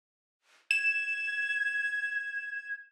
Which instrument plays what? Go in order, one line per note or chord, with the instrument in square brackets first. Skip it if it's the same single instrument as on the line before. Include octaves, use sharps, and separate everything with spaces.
[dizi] G#6 [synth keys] E7